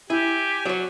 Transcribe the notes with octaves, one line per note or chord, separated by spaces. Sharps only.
E4 G4 G#5
F#3 C#5 D5